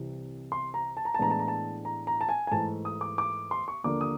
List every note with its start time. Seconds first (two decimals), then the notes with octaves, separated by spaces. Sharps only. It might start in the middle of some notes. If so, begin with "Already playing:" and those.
Already playing: C2 C3 E3
0.52 C6
0.74 A#5
0.97 A5
1.05 A#5
1.14 A5
1.19 A2 E3 G#3 B3 D4 A#5
1.31 A5
1.39 A#5
1.48 A5
1.85 A#5
2.07 A#5
2.21 A5
2.29 G#5
2.47 G#5
2.51 G#2 E3 A3 A5
2.85 D#6
3.01 D6
3.18 D6
3.51 C6
3.68 C#6
3.84 D#2 D3 F3 A#3 D4 D6
4.01 D#6